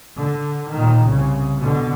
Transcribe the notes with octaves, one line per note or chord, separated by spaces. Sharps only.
D3
A#2 D#3
C2 C#3
B2 D3